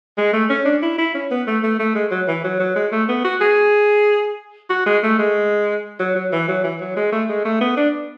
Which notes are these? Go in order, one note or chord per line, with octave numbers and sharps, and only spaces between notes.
G#3
A3
C#4
D4
E4
E4
C#4
B3
A3
A3
A3
G#3
F#3
E3
F#3
F#3
G#3
A3
B3
F#4
G#4
F#4
G#3
A3
G#3
F#3
F#3
E3
F#3
E3
F#3
G#3
A3
G#3
A3
B3
D4